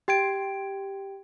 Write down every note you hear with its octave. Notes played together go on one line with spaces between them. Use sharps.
G4 G5 G#6 D7